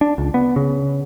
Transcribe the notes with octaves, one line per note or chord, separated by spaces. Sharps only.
D4
C#2
B3
C#3